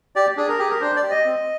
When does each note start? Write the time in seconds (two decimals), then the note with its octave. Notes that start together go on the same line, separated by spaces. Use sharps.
0.16 G4 D5
0.37 D4 G#4
0.48 A#4
0.59 G4 G#4
0.70 A#4
0.81 D4 C5
0.96 D5
1.03 G4
1.11 D#5
1.25 C4